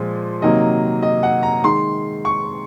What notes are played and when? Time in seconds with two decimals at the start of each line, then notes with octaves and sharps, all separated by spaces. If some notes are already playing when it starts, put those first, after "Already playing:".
Already playing: A#2 F3 G#3
0.42 C3 D#3 F#3 A#3 D#5
1.03 D#5
1.23 F#5
1.43 A#5
1.64 D#3 G#3 C6
2.25 C#6